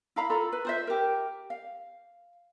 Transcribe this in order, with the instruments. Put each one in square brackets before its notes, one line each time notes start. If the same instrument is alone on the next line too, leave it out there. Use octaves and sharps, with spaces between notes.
[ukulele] E4 F5 A#5 B5
F4 A4 A#5 B5
B4
F4 C5 E5
G4 A#4
F5